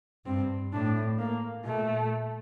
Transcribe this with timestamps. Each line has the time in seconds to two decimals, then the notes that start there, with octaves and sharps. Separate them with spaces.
0.26 G2 C4
0.73 A2 D4
1.19 A#3
1.65 A#2 A3